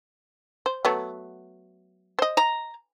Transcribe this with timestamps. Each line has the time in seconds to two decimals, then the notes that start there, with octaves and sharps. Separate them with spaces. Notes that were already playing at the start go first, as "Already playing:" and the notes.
0.66 C5
0.85 F#3 A3 B3
2.19 C5 D#5
2.37 A#5